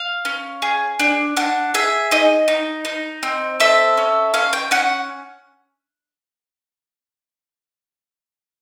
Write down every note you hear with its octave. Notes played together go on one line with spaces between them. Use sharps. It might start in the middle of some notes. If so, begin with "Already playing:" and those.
Already playing: F5
C#4
G#4
D4
D4 F#5
G#4 E5
D#4 D#5
D#4
D#4
C4
A4 E5
C#4
C#4 F5
G5
C#4 F#5